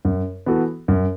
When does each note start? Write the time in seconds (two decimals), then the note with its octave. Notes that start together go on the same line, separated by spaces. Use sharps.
0.05 F#2
0.46 E3 B3 F#4 A4
0.88 F#2